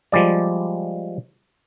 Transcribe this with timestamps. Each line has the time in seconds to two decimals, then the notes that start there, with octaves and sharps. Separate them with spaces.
0.12 F3 G3 G#3 D5